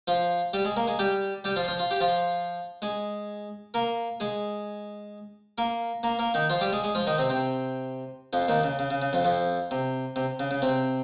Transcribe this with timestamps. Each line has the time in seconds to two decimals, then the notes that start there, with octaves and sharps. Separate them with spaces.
0.08 F3 F4
0.53 G3 G4
0.65 G#3 G#4
0.76 A#3 A#4
0.87 G#3 G#4
0.99 G3 G4
1.44 G3 G4
1.56 F3 F4
1.68 F3 F4
1.79 F4
1.91 G4
2.01 F3 F4
2.82 G#3 G#4
3.74 A#3 A#4
4.20 G#3 G#4
5.58 A#3 A#4
6.03 A#3 A#4
6.19 A#3 A#4
6.34 D#3 D#4
6.50 F3 F4
6.61 G3 G4
6.73 G#3 G#4
6.84 G#3 G#4
6.95 F3 F4
7.06 D#3 D#4
7.18 C3 C4
7.29 C3 C4
8.33 F2 F3
8.48 D#2 D#3
8.64 C#3
8.79 C#3
8.90 C#3
9.02 C#3
9.13 F2 F3
9.25 F2 F3
9.71 C3
10.16 C3
10.40 C#3
10.51 C#3
10.62 C3 C4